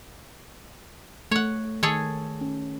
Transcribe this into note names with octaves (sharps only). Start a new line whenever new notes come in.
A3 C#5 F#5
D#3 G#4 A4 C#5
C#4